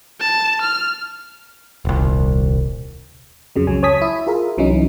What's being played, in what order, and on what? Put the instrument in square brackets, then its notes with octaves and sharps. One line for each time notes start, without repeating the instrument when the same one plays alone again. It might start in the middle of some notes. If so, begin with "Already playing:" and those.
[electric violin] A5
F6
[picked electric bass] D#1 C2
[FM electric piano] F2 C#3 F#3
C#2 F#3 G#5
C#5 G#5 A5 D#6 G#6 B6
E4
F4 G#4 A#4 E5
C2 E3 F#3 C#4 D#4